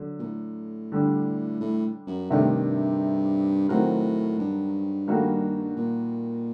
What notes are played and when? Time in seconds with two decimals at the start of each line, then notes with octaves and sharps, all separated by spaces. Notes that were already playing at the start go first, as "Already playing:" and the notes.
Already playing: D3 F#3
0.19 A#2
0.23 A2
0.92 D3 G3 D4
1.61 A2
2.07 F#2
2.30 G2 C3 D#3 A3 D4 A4
3.69 A2 D#3 F#3 C4 F#4 A#4
4.39 G2
5.07 D#3 G3 A#3 F#4 A4
5.76 A#2